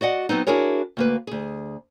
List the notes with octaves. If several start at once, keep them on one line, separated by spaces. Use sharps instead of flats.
F#4 D5 D#5 F#5
F#3 B3 C4 D#4
D4 E4 F#4 G#4 A#4 C#5
D2 A#3 B4
D2 G#4